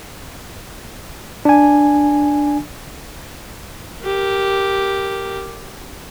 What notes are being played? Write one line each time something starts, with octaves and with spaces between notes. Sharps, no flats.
D4 G#5
G4 A#4